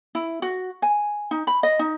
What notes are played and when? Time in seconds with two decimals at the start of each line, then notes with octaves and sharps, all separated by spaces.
0.15 E4
0.42 F#4
0.82 G#5
1.31 D#4
1.47 B5
1.63 D#5
1.79 D#4